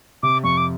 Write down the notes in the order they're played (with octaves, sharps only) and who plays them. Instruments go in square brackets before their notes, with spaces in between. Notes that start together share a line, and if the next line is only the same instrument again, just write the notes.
[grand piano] C3 [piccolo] D6
[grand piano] F2 [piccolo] C#6
[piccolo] D6